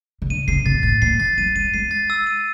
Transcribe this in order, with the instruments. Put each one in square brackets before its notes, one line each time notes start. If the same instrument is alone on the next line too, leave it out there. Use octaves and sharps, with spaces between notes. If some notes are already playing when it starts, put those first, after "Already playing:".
[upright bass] C#3
[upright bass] D3 [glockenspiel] D#7
[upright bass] C#3 [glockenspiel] C7
[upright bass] B2 [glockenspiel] A6
[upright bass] A2 [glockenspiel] A6
[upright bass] A#2 [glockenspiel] C7
[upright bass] D#3 [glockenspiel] A6
[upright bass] F#3 [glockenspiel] D#7
[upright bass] G3 [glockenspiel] D#7
[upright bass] G#3 [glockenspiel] C7
[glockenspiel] A6
E6
D#7